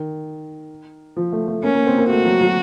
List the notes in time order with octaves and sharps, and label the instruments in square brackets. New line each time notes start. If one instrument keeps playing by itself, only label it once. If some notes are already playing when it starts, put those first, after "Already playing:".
Already playing: [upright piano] D#3
F3
A3
A3
[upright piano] A#3 [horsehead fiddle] C#4
[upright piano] A#3
C4
A#3
[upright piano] A3 [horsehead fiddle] F#4
[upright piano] F#3
F#3